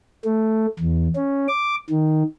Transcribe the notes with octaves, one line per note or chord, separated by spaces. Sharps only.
A3
E2
C#4
D6
D#3